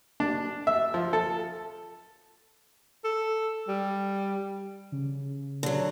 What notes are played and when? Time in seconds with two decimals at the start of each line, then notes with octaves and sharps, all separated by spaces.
0.20 D4
0.67 E5
0.94 F3
1.13 A4
3.04 A4
3.68 G3
4.92 C#3
5.63 D3 F#3